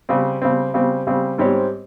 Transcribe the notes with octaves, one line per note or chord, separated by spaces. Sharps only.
C#3 G3 C4
C#3 G3 C4
C#3 G3 C4
C#3 G3 C4
G#2 G3 C4 G4 C#5